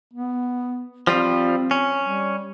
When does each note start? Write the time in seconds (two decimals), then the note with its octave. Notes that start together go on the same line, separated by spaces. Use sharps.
0.13 B3
1.07 F3 G3 C4 F4
1.71 C#4
2.01 G3